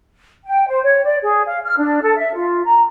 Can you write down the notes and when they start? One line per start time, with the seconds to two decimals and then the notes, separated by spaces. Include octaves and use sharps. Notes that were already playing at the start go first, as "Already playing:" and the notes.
0.45 G5
0.68 C5
0.83 C#5
1.05 D5
1.22 G#4
1.46 F5
1.65 F6
1.77 D4
2.02 A4
2.17 E5
2.34 F4
2.65 A#5